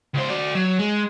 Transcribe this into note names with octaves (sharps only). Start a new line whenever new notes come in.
C#2 C5
F#4 D5
F#3
G#3